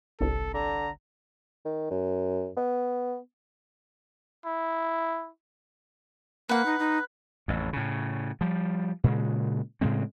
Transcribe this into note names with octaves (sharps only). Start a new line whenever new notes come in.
G1 C2 A4
D3 A#5
D#3
F#2
B3
E4
A#3 B4 F#5
D#4
D#4
A1 F2
A2 C#3
F3 G3
A#2 C#3 G#3
A2 C#3 G#3 C4